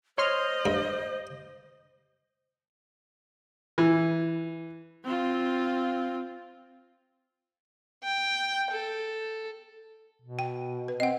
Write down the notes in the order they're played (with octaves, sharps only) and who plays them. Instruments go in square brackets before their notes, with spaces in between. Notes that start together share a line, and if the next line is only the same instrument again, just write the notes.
[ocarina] C5 [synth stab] C#5 C6 F6 [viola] D#5
[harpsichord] G2
[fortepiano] E3
[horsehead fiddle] C4 F4
[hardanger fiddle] G5
A4
[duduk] B2
[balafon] G5
B4
[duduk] C4 [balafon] D#5 F#5